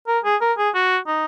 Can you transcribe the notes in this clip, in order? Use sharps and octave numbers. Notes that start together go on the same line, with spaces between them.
A#4
G#4
A#4
G#4
F#4
D#4